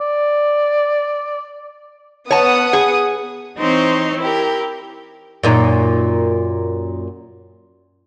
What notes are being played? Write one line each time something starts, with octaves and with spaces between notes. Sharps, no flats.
D5
B3 C#5 F#5 A5 D#6
G#4
E3 C4 D#4 C5 C#5
E4 G4 A#4
F#2 A#2 D#4